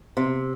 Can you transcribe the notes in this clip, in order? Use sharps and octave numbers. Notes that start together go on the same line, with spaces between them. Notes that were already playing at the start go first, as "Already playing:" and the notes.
C3